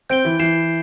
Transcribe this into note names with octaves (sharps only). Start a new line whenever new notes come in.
C4 G6 D7 G7
E3
E3 G6 C7 E7